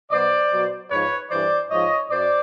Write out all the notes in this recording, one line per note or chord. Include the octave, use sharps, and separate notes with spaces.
B2 F#3 C5 D5
B2 F#3
G#2 F3 B4 C#5
G2 E3 C5 D5
G#2 F3 C#5 D#5
F#2 C5 D5